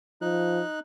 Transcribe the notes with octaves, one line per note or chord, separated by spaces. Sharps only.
F3 D#4 F#6